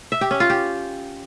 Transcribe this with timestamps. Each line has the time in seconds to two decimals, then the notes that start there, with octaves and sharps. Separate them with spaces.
0.12 E5
0.21 G4
0.31 C#4
0.40 F4
0.50 G4